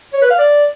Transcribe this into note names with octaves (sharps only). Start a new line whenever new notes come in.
C#5
B4
F5
D5